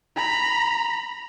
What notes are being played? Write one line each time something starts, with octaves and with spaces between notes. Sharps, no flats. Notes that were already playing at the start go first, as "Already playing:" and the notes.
A#5 B5